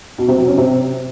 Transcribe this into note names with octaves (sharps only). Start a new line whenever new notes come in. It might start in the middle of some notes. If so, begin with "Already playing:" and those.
B2
C3
F#3
C#4
C3